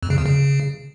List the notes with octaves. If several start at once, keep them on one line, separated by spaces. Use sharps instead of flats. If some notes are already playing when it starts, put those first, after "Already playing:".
F2
C#3
E2
C#3